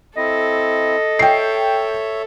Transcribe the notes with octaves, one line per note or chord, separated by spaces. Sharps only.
C4 E4 A4 D#5
C#5 E5 G5 C7